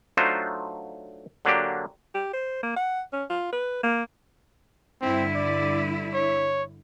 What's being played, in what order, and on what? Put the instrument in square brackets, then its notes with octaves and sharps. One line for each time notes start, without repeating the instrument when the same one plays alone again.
[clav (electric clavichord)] F#3 A3 D4 D#4 F4 C5
D3 F#3 A#3 D4 G4
[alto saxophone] G4
C5
A#3
F#5
C#4
F4
B4
A#3
[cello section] G2 D3 E4 [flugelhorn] C4
[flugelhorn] D5
C#5